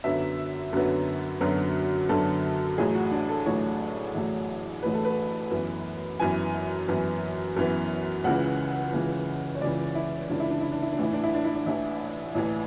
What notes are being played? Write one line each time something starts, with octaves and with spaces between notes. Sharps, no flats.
F#2 D3 F#3 B3 E5
F#2 D3 F#3 B3
F#2 D3 F#3 B3
F#2 D3 F#3 B3 A4
A1 A2 F#3 G#4
F#4
D4
A4
A1 A2 F#3 C#5
A1 A2 F#3
A1 A2 F#3 B4
A4
B4
F#2 E3 B3
F#2 E3 B3 G#5
F#2 E3 B3
F#2 E3 B3
C#2 C#3 E3 F#5
C#2 C#3 E3
C#5
C#2 C#3 E3 D5
E4
C#2 C#3 E3 D4
E4
D4
E4
D4
E4
D4
A1 A2 E3 E4
D4
E4
D4
E4
D4
A1 A2 E3 E4
A1 A2 E3